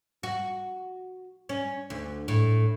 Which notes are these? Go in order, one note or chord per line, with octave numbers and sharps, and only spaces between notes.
F#4
C#4
D2
A2